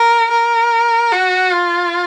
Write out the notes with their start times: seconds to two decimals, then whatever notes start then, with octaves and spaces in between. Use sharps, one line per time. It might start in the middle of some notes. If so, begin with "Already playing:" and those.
Already playing: A#4
0.31 A#4
1.12 F#4
1.54 F4